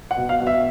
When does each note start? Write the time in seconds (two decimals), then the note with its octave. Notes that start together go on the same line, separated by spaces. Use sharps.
0.11 F#5
0.17 B2
0.29 F5
0.40 B2
0.47 E5